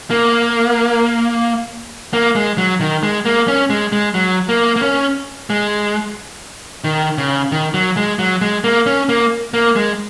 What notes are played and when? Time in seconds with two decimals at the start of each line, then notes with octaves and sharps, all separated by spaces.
0.11 A#3
2.13 A#3
2.36 G#3
2.58 F#3
2.80 D#3
3.03 G#3
3.25 A#3
3.48 C#4
3.70 G#3
3.92 G#3
4.14 F#3
4.49 A#3
4.76 A#3
4.82 C#4
5.50 G#3
6.84 D#3
7.18 C#3
7.52 D#3
7.74 F#3
7.97 G#3
8.19 F#3
8.41 G#3
8.64 A#3
8.86 C#4
9.09 A#3
9.54 A#3
9.76 G#3